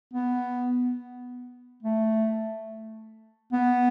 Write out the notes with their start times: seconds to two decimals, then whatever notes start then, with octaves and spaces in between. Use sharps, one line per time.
0.13 B3
1.83 A3
3.52 B3